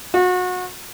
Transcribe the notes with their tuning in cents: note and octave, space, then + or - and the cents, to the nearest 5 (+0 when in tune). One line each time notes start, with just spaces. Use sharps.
F#4 -30